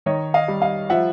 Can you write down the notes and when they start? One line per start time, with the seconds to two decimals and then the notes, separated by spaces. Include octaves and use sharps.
0.06 D#3 C#5 D#5
0.34 D#5 F5
0.48 G3
0.62 D#5 F5
0.90 F3 E5 F#5